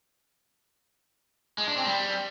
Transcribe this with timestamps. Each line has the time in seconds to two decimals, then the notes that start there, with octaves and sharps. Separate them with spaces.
1.58 G#3
1.68 D4
1.77 C4
1.86 G3